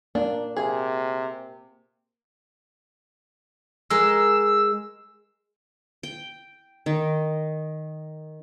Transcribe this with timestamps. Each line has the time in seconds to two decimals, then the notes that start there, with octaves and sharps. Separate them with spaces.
0.15 A#3 D4
0.57 C3 G#4
3.90 G#3 A#4 E6
6.03 G5
6.86 D#3